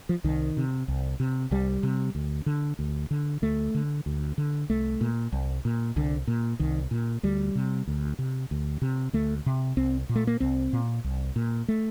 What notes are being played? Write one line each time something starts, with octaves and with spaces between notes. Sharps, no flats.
F3
C2 D#3
C3
C2
C3
C2 G3
C3
D2
D3
D2
D3
D2 A3
D3
D2
D3
C2 A3
A#2
C2
A#2
C2 D3
A#2
C2 D#3
A#2
D2 G3
C3
D2
C3
D2
C3
D2 A3
C3
C2 C4
A#2
A3
A#3
C2 C4
A#2
C2
A#2
A3